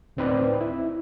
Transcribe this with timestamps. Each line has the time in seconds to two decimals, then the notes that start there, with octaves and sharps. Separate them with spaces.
0.17 D2 A2 C4 D#4 B4 D5
0.61 E4